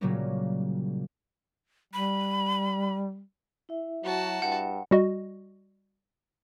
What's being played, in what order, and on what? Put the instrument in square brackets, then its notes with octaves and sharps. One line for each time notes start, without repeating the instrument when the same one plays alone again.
[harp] A#2 C#3 F#3 G3 A#3 C#4
[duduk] G3 [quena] B5
[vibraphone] E4 E5
[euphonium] F#3 [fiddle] F#4 A5
[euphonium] G2 [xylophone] F#5
[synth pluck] G3 F#4 D#5